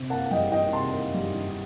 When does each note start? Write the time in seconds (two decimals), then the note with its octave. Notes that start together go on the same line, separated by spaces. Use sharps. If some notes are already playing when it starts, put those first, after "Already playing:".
Already playing: C3
0.10 A#3 F#5 A5
0.31 G3 D#5 G5
0.52 D#3 D#5 G5
0.72 C3 A5 C6
0.93 A#3
1.14 G3
1.35 D#3